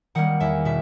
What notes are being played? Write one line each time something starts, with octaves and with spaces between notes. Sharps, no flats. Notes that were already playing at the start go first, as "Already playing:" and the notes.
D#3 G3 A#3 F#5
E2 E5
B2 E5